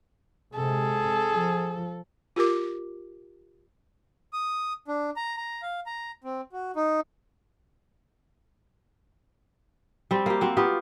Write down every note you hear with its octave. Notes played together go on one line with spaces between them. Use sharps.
C3 G#3 G#4 A4
F3
F4 G4 A#4 D6
D#6
D4
A#5
A#5
F5
A#5
C4
F#4
D#4
G3 C4
A#3 G4
C4 F#4
B3 F4 G4